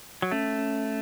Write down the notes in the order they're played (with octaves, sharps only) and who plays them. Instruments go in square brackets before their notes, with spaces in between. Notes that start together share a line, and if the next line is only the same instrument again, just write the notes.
[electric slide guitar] F#3
[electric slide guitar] A3 [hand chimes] C#4
[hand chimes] C#4
C#4